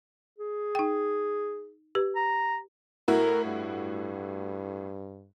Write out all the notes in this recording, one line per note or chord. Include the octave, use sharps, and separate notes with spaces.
G#4
D#4 G5
G4 B4
A#5
A2 E4 F#4 A#4
G2